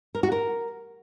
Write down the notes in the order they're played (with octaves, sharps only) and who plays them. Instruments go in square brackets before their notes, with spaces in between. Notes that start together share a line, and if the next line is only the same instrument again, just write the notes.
[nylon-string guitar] A#4
F#4
A#4